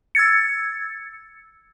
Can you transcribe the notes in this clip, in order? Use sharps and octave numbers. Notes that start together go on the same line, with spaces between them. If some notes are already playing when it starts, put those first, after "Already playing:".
E6 G#6 A6 C#7